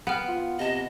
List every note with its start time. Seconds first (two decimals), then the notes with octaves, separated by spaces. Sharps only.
0.07 B3 F#5 G5 F6
0.28 F4
0.59 C3 D#5 A5 A#6